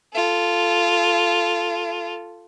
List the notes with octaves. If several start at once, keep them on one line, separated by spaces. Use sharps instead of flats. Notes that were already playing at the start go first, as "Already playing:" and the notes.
F4 A4